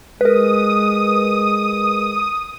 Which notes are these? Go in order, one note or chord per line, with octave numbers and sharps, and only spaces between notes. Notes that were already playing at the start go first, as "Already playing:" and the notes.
G#3 A#4 B4 D#6